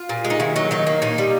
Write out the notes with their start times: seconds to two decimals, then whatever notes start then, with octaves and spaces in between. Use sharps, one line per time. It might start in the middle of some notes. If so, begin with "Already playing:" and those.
Already playing: F4
0.09 A#2
0.25 G#3
0.30 D#4
0.40 D#3 E4
0.56 F#3 D#4
0.71 D#3 D#4
0.87 A#3
1.02 A#2 D#4
1.18 G3